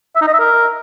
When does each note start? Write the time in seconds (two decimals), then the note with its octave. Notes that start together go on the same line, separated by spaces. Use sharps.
0.16 E5
0.22 D#4
0.28 D#5
0.34 E5
0.39 A#4